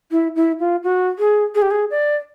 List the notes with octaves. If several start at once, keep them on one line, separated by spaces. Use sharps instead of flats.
E4
E4
F4
F#4
G#4
G#4
G4
G#4
D5